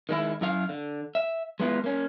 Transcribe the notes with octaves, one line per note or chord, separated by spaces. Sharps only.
D#3 G#3 E4
F#2 E4 F5
D3
E5
G#3 B3 E4 F4
A#3 C#4